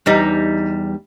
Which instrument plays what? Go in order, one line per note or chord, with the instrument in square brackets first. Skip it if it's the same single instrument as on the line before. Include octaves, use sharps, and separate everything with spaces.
[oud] E2 G3 D#4